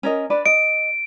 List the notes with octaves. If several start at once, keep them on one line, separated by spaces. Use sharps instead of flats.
C#4 A#4 D#5
D4 B4 D5
D#5 D7